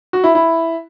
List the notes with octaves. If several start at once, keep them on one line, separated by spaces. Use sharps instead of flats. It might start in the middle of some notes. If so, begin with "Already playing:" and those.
F#4
E4
E4